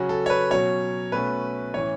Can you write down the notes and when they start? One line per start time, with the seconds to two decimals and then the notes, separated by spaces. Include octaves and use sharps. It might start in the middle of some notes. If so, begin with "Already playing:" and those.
Already playing: C#3 F#3 C#4 F#4
0.09 A4
0.26 C#5
0.30 B4
0.50 B2 F#3 C#4 C#5
1.12 B2 A3 C#4 B4
1.74 A2 E3 C#4 C#5